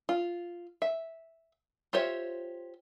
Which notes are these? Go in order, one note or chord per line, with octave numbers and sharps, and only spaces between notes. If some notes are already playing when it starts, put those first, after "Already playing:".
F4
E5
F4 G4 C5 C#5 E5